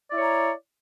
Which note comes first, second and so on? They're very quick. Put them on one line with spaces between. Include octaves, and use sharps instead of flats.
D5 E4 C#5 A#5